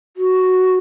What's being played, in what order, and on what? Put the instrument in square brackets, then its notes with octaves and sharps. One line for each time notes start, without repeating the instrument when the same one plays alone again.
[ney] F#4